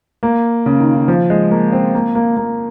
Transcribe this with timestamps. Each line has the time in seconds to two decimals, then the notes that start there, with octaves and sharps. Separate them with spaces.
0.23 A#3
0.66 C#3
0.80 D#3
0.94 D#3
1.08 F3
1.30 G#3
1.51 A#3
1.73 C4
1.95 A#3
2.15 A#3
2.37 A#3